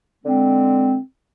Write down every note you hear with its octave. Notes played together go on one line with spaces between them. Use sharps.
D3 G#3 C4